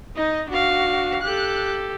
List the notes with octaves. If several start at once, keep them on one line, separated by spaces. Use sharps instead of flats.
D#4 D#5
D4 F#4 F5
G4 A4 F#6